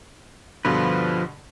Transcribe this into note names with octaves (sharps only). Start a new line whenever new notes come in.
G2 B2 D3 F3 F4 B4